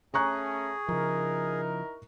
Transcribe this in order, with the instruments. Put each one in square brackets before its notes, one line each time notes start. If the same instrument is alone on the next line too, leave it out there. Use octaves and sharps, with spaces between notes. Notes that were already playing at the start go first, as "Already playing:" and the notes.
[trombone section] A3 C#4 [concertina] G#4 [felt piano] A#5 C#6 F#6
[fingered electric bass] C#3 F3 [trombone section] D#4 E4 A#4